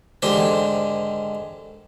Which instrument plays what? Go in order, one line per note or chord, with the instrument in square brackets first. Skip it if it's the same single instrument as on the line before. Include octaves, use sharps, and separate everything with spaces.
[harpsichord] G#2 D3 D#3 G4 C5